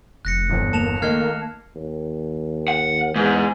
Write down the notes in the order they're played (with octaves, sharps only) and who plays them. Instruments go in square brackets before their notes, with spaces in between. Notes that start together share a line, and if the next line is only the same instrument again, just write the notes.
[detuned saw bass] F1 [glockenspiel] F#6 A#6 C#7
[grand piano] G1 E2
[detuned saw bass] A#3 [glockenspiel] A5 E7 F7
[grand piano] D#3 A3 D#4 [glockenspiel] F6 G#6 C7
[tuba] D#2
[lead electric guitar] F#5
[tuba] E2 [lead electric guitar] G#2